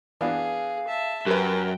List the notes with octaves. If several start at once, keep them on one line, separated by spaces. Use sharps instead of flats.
E3 B3 D4 G#4 F5
E5 A5
F#2 G4 A#4 B4 G5